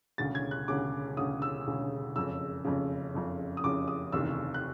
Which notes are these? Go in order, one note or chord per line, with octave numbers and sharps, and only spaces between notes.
E1 D2 C#3 A6
G#6
F#6
E1 D2 C#3 D6
E1 D2 C#3 D#6
E6
E1 D2 C#3
F#1 F2 C#3 E6
F#1 F2 C#3
F#1 F2 C#3
D#6
F#1 F2 C#3 D6
D#6
F1 D#2 C#3 E3 E6
F#6